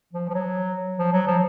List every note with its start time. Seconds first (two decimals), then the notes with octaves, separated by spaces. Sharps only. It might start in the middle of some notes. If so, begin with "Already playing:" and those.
0.13 F3
0.29 F3
0.34 F#3
0.99 F3
1.13 F#3
1.27 F3